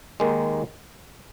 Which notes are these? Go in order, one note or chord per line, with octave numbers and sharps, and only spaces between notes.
D#2 D#3 G#3